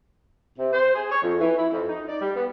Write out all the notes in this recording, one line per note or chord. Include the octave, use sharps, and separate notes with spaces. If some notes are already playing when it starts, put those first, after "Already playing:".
C3
C5
G#4
C#5
F2
E3
E4
F2
D#4
D5
G3
B3